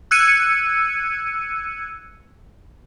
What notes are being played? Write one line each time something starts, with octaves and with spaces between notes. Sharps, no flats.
E6 F#6 G#6 C#7 D#7